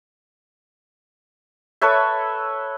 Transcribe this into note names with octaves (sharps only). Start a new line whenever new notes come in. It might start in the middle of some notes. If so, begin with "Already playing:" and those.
A4 B4 C#5 E5